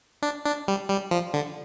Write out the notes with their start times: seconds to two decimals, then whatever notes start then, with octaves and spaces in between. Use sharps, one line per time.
0.22 D4
0.45 D4
0.68 G3
0.90 G3
1.11 F3
1.34 D3